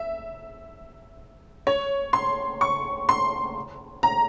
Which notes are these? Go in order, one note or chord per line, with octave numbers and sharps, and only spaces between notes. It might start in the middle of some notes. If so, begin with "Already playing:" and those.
Already playing: E5
C#5
C6
C#6
C6
A#5